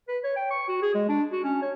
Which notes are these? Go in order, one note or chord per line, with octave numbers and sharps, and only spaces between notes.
B4
C#5
G5
C#6
F#4
G#4
G#3
D4
F#4
C#4
C#5